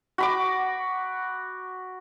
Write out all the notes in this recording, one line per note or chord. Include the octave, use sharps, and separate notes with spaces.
F#4 B5 D6